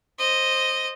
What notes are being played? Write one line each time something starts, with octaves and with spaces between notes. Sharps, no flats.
C5 D#5